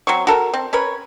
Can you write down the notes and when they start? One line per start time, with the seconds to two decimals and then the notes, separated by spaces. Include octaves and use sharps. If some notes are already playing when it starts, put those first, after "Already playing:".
0.07 F#3 C4 C#6
0.27 F#4 A4 A#4
0.54 C4
0.73 C#4 A#4 B4 C#5